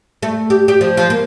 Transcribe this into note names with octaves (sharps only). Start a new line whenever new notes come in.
A3
G4
G4
F3
F3
A#3